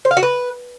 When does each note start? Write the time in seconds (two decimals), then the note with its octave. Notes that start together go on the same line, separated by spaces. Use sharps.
0.05 C5
0.11 F5
0.17 F#4
0.23 B4